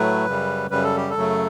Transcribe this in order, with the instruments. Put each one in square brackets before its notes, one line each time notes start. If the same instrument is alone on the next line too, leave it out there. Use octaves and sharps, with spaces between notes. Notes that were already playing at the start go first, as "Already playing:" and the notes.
Already playing: [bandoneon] A2 F#3 A3 B4
F#2 C#3 G3
F#2 C#3 G3 B4
A4
G4
A4
F#2 C#3 F#3 A3